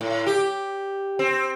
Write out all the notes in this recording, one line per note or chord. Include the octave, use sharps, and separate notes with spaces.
A2
G4
C4